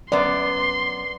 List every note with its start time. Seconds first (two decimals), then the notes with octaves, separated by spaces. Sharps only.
0.12 F#2 B3 D5 C6